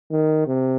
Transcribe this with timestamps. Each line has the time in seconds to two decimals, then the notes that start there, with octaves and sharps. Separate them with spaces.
0.11 D#3
0.47 C3